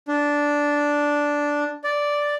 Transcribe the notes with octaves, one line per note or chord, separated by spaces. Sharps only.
D4
D5